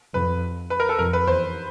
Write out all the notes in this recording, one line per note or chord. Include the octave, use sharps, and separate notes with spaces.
F2 B4
B4
A#4
A4
F2 A#4
B4
E2 C5